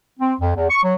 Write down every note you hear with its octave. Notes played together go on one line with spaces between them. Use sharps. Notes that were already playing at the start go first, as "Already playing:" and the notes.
C4
F2
E2
C#6
F#3